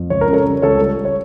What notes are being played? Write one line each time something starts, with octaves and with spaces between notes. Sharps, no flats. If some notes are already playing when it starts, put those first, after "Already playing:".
Already playing: F2
C#2 C#5
A#4
C#3
A4 C#5
G3
C#2 A4 C#5
G3
G3
C#5